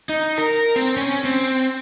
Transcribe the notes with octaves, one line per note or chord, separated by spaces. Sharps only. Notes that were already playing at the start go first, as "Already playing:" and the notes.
D#4
A#4
C4
C#4
C4